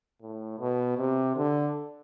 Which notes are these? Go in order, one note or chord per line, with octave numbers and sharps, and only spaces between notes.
A2
B2
C3
D3